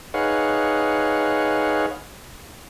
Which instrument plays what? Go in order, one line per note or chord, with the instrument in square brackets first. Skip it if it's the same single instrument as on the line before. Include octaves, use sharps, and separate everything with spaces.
[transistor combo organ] D#4 G#4 B4 C#5 F5 F#5